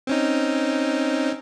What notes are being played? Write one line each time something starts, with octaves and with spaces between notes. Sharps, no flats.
C4 C#4 D#4